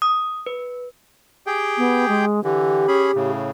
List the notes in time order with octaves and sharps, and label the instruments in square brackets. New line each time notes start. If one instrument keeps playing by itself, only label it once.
[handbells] D#6
B4
[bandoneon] G4 G#4 G5
[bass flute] B3
G#3
[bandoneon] D3 E3 [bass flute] G4
[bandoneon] C#4 G#4 B5
A2 C#3